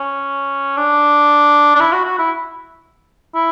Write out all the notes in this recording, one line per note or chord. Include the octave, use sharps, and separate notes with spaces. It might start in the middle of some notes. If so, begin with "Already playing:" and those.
Already playing: C#4
D4
D4
E4
F#4
F#4
E4
E4